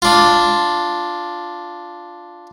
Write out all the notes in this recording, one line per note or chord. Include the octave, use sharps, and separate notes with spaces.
D4 F4